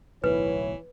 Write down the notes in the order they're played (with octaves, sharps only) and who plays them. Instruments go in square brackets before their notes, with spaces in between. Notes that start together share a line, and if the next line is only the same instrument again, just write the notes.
[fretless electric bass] D1 B1 A2 [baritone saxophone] E3 [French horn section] B3 E4 C#5 [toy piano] B4